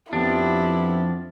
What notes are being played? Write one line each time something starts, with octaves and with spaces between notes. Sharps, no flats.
F2 F3 B3 D4 E4 G4